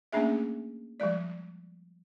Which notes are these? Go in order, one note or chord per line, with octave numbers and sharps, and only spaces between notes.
A3 A#3 C#4 D4 G#4 E5
F3 G3 G#3 D5